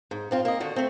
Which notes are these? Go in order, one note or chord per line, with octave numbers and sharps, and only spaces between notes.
G#2
F3 C4 F4
A#3 D#5
D3 D#3 F#4
A3 C4